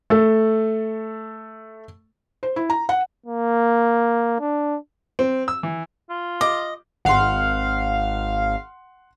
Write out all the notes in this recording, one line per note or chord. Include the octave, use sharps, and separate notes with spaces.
A3 A4
C5
E4
A#5
F#5
A#3
D4
C4
E6
E3
F4
D#5 D6
G#1 F5 F#5 C6